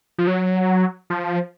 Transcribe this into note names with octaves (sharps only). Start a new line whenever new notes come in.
F3
F#3
F3